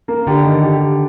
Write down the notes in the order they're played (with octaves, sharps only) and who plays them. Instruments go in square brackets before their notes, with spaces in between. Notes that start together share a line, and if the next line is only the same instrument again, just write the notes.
[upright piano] A#3
[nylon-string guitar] D3 [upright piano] G4
[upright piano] D#3
G4
G4